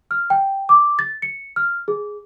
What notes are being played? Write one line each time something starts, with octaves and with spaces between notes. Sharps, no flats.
F6
G5
D6
A6
C#7
F6
G#4